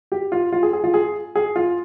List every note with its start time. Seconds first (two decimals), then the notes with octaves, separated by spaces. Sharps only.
0.12 G4
0.32 F4
0.52 F4
0.63 G#4
0.73 G#4
0.84 F4
0.94 G#4
1.35 G#4
1.56 F4